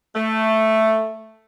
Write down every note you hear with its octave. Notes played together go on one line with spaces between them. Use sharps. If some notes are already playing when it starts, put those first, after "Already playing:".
A3